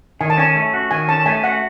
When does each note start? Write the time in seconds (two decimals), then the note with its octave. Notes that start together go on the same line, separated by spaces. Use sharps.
0.21 D#3 G#5
0.30 A5
0.38 C#4 G#5
0.56 A3
0.74 F#4
0.91 D#3 G#5
1.08 C#4 A5
1.26 A3 G#5
1.44 F#4 F#5